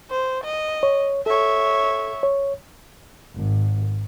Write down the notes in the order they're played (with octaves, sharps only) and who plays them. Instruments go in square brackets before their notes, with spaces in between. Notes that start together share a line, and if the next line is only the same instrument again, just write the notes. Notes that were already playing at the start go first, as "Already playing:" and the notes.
[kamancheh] C5
D#5
[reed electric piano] C#5
[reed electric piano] A4 [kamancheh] C#5 E5
[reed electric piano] C#5
[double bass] G#1